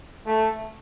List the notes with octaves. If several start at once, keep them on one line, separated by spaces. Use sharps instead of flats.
A3